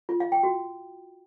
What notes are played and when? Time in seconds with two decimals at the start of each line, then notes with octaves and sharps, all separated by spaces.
0.09 F4
0.20 F5
0.32 G5
0.43 F#4